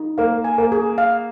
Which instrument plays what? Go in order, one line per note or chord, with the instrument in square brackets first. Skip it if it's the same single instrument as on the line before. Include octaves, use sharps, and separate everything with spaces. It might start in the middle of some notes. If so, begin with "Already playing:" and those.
Already playing: [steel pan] D#4
[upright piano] A#3 [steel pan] F5
[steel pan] G#5
[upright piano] A#3
[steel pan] G#4
F5